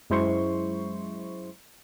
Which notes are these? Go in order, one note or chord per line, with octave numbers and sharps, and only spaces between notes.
F#2 G#3 E4 C5 C6 C#6